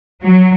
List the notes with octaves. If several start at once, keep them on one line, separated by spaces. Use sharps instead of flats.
F#3